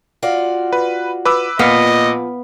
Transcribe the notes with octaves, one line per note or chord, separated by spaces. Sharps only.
F4 F#4 D5
B4
B4 D6 E6
A#2 F3 B3 D#5 F5